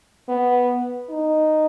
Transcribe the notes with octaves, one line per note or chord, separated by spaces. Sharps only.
B3
D#4